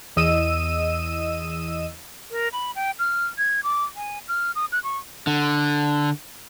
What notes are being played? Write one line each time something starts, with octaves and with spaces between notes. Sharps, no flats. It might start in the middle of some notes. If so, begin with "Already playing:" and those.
E2 D#5 E6 D#7
A#4
B5
G5
F6
G#6
D6
G#5
F6
D#6
F#6
C#6
D3